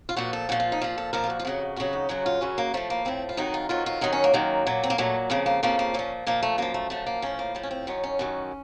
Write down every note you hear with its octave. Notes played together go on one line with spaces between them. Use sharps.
F4
A#2 F3 F#4
A4
A#2 F3 F#4
F4
D#4
A#2 F3 F4
A4
A#2 F3 A#4
F4
F#4
F4
F2 C#3 F#3 F#4
F2 C#3 F#3 F#4
D#4
F#2 C#3 F#3 F#4
F4
F#2 C#3 F#3 C#4
A#3
A2 F3 A3
A#3
A2 F3 C4
F4
F2 D#3 F#3 D#4
F4
F2 D#3 F#3 F4
F4
F#2 D#3 F#3 D#4
C#4
A#3
F#2 D#3 F#3
A#2 F#3
C4
A#3
A#2 F#3 A3
F2 C#3 F3 A#3
A#3
F2 C#3 F3 A#3
A#3
A#2 F3 C#4
A#2 F3 A#3
A3
F#2 F3 A#3
A3
F#2 F3 A3
A#3
A2 F3 C#4
A#3
A2 F3
C#4
C4
F#2 D#3 F#3 C#4
C#4
F#2 D#3 F#3